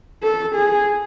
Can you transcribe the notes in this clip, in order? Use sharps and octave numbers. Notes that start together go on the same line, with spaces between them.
A4
G#4